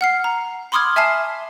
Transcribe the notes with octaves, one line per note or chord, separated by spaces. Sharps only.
F#5 F6 C7
A#5
B5 C6 D6 D#6 F6 G#6
E5 G#5 A5 F6 C7 E7